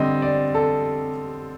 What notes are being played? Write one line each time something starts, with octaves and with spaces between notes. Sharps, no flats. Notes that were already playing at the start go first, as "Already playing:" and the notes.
Already playing: D3 G3 C4 D#5
D5
A4